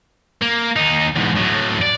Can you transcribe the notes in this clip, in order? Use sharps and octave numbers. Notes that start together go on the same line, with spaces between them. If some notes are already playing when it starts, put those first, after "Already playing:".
A#3
D#2 D#4
E2 G#2
A2 F#3
D5